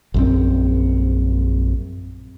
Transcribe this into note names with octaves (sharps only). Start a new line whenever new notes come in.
A#1 F#2 C4